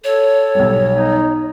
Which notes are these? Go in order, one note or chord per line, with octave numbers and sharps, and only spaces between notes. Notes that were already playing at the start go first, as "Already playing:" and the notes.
A4 C#5
B1 G3
D#4